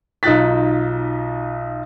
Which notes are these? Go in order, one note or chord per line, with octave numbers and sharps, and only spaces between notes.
B1 D#4 F4 F#6 A6 B6